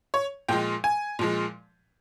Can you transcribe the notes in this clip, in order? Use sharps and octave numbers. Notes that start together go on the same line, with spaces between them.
C#5
A#2 F3 G#3 G5
G#5
A#2 F3 G#3